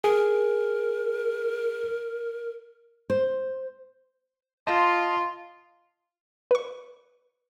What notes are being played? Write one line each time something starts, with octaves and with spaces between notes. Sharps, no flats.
G#4 A#4
C5
F4 D#5 A5 C6 D#6
B4 C#6